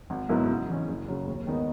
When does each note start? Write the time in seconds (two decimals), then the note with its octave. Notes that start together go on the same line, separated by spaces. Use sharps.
0.10 G#1
0.29 G#2 F#3 B3 E4
0.49 C#3
0.69 E3 G#3 C#4
0.88 F#1
1.08 F#2 C#3
1.27 D#2
1.47 D#3 G#3 B3 D#4